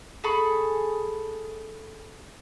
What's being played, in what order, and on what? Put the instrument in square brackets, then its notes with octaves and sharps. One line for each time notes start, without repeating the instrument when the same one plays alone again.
[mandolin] G#4 A4 B5 C#6